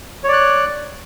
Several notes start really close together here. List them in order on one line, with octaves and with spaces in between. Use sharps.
C#5 D5 F#6